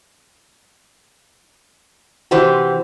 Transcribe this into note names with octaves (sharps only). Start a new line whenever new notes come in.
C3 E3 F#4 G4 C5